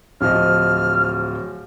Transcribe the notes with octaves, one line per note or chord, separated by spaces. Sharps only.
D1 F3 D#5 F6